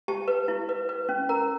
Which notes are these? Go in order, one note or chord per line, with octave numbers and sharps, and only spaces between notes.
G4 A5
B4
E4
B4
B4
C#4
A#4 A#5